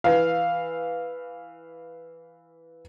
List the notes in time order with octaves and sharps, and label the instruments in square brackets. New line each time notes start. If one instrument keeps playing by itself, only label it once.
[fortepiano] E3 F5